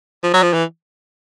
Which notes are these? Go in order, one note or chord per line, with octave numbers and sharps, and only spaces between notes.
F3
F#3
F3
E3